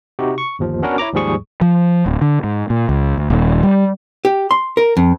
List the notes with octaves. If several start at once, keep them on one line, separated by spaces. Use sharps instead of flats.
C3 D#4 F#4 G4
C#6
G1 D#2 F3
B3 C#4 D4 F#4 A#4 B4
E4 C#5 A#5 D6
D#2 G#2 F3 G3 G#4 C#6
F3
D1
D3
G#2
A#2
C#2
D2
D#1
G3
G4
C6
A#4
F2